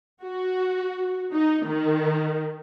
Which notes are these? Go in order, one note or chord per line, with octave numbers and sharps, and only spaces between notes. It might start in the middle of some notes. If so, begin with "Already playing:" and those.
F#4
D#4
D#3